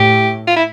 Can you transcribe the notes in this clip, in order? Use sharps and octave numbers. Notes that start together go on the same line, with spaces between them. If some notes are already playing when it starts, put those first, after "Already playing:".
Already playing: A2 G4
F4
E4